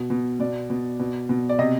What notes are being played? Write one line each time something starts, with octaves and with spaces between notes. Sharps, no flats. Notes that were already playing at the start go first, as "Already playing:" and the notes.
Already playing: B2
B2
B2 D5
B2
B2
B2
D5
C3 D#5